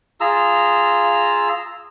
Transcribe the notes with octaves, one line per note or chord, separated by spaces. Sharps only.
F4 G#4 A#5 E6